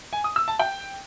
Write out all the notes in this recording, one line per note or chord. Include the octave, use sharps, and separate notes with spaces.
G#5
D#6
E6
A5
G5